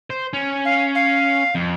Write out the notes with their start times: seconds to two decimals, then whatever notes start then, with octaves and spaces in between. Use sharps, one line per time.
0.10 C5
0.33 C#4
0.65 F5
0.95 F5
1.55 F2